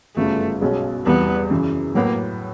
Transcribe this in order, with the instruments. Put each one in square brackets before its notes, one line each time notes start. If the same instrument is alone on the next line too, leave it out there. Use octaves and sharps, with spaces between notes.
[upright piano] G1 F#2 C#3 [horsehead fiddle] A3
[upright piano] B1 B2 G#3 C#4
[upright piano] E2 C3 E3 G3 [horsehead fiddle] B3
[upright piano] F#2 C#3 E3
[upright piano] A2 F#3 B3 [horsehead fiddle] A#3